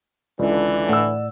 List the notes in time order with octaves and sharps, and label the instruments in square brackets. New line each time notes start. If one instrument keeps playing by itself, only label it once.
[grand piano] C#2 [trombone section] D3 E3 [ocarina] D5
[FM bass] A2 [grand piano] F#5 E6